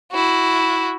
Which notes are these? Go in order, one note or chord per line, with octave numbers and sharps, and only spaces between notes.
E4 F#4